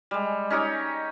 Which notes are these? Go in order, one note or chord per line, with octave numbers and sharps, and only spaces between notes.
G3 G#3
C#4 D#4 G4 C#5